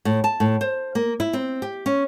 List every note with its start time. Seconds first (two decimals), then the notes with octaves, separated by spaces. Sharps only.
0.05 A2
0.24 A5
0.40 A2
0.61 C5
0.95 A#3
1.20 E4
1.33 C4
1.62 G4
1.86 C#4